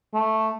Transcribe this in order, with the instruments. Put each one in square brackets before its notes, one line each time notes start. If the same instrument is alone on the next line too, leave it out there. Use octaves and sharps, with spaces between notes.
[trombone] A3